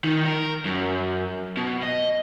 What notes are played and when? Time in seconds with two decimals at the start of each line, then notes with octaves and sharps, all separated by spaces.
0.04 D#3
0.25 A#4
0.65 F#2
1.57 B2
1.82 D#5